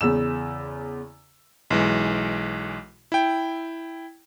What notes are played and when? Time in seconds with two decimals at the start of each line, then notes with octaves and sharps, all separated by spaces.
0.01 E2 C#3 E6 E7
1.70 B1 E3 G#3
3.12 E4 G5